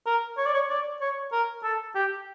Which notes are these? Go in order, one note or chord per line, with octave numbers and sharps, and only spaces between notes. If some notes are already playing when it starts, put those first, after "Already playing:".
A#4
C#5
D5
C#5
D5
C#5
A#4
A4
G4